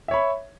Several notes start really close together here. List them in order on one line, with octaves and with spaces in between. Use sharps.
E5 C#5 B5